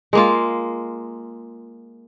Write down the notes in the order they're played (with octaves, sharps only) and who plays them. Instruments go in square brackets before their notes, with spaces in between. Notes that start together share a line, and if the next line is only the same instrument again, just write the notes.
[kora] G#3 A#3 F4